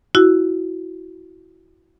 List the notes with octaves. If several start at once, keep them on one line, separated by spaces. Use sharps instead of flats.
E4 F#4